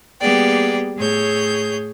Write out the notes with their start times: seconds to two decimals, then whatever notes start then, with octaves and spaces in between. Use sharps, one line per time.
0.21 G3 A#3 B3 G#4 D5 G5
0.97 A2 G#4 C#5 G6